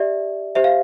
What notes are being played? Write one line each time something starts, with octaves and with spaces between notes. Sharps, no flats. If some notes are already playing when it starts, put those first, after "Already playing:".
Already playing: G4 D5 E5
G4 C5 E5
F5